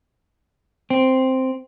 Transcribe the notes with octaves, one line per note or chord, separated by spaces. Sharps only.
C4